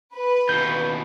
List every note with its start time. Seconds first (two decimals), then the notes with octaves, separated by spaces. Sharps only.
0.14 B4
0.49 D#2 B2 G6